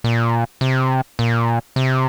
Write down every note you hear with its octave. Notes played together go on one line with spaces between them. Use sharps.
A#2
C3
A#2
C3